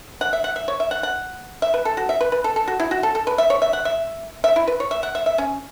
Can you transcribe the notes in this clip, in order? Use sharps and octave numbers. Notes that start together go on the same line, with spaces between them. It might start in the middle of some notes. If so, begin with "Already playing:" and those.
F#5
E5
F#5
E5
C#5
E5
F#5
F#5
E5
B4
A4
F#4
E5
B4
B4
A4
A4
F#4
E4
F#4
A4
A4
B4
E5
C#5
E5
F#5
E5
E5
E4
B4
C#5
E5
F#5
E5
E5
C#4